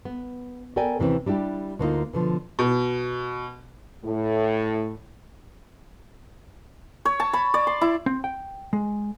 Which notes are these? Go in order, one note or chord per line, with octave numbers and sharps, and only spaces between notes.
B3
B3 A4 A#4 D5 G5 G#5
D#2 C3 E3 A3 C4 C#4
G3 D4 E4 F#4 G4
D2 D3 A#3 C#4 D#4 F4
B2 D3 F3
B2
A2
C#5
A5
B5
D5
C6
E4
C4
G5
G#3